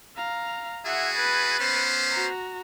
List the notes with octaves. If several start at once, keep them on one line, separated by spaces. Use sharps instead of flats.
F5 A#5
E4 F#4 G#4 E5 F#5
B4 A6
B3 C#4 C5
F#4 A#5